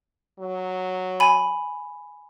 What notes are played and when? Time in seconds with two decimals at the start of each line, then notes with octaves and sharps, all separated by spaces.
0.39 F#3
1.20 G#5 B5